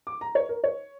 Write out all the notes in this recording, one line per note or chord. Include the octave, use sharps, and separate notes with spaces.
D6
A#5
C#5
A#4
C#5